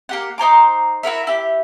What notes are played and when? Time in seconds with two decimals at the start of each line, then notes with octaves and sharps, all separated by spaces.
0.09 A#3 G4 F#5
0.38 D#4 C5 A#5 D6
1.03 E4 F#4 A#4 E5
1.27 E4 G4